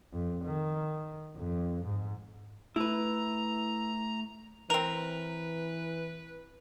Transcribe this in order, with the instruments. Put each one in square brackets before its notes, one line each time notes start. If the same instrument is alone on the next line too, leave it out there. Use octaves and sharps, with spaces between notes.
[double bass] F2
D#3
F2
G#2
[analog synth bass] A3 [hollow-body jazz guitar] E4 B4 [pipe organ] A#5
[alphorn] E3 [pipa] C4 A#4 [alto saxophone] B4 [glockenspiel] F7